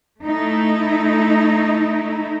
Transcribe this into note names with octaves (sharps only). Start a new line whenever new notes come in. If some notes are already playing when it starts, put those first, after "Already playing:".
A3 D#4 E4